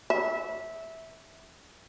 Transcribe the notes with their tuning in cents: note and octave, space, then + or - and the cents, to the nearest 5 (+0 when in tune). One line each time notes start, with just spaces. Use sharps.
E5 -15